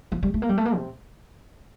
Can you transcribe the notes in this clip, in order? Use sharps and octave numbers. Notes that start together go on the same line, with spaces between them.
F3
G3
A3
A#3
G3
A3
A#3
C3